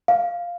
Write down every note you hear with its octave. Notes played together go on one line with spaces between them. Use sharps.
F5